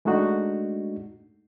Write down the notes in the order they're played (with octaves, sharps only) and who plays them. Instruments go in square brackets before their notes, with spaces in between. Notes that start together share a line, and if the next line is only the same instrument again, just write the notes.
[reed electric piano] G#3 A3 D4 D#4 F#4